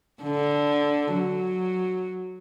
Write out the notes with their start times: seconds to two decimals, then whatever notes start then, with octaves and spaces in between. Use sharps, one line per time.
0.23 D3
1.14 F#3